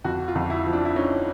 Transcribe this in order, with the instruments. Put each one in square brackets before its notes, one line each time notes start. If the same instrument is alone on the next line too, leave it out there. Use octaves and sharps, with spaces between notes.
[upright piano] F2 [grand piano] F#4
[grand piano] F4
[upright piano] F2
[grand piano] E4
[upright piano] F3
[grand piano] D4
E4
[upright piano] C#4 [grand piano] D#4